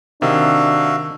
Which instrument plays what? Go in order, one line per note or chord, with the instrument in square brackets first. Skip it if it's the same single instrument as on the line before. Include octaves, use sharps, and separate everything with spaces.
[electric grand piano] C3 [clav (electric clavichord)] D#3 [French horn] D4 [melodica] F#4 E5 F5